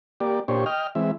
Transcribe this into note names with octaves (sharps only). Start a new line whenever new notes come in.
A#3 G4 D5
A#2 D4 G4 C5 C#5
D#5 G5 F6
E3 G#3 C4 E5